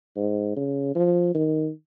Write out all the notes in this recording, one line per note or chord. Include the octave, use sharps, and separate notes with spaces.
G#2
C#3
F3
D#3